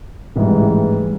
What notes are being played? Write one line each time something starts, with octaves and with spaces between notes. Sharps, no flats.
A1 G#2 E3 G3